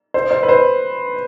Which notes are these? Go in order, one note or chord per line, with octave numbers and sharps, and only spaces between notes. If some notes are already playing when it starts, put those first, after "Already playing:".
C5
C5
B4
C5